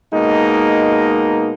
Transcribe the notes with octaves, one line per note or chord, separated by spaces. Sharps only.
B2 G#3 A#3 D#4